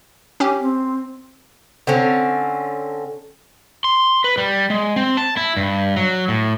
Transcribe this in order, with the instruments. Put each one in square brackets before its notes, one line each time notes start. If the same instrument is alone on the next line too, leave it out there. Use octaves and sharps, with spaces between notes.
[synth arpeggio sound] C#4 G4
[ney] C4
[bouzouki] D3 C4 C#4
[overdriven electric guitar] C6
B4
G3
G#3
C4
A5
E4
G2
F#3
A2